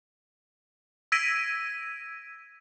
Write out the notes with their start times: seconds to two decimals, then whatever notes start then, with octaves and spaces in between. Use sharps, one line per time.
1.12 E6 G#6 A#6 B6 D7 D#7